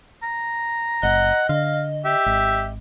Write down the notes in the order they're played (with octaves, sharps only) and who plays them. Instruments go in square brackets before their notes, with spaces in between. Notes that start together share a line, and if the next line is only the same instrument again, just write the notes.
[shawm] A#5
[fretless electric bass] F#1 [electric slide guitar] D#5 [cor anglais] F#5
[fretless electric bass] D3 [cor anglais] F5
[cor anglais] G4 [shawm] E5
[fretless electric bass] G#1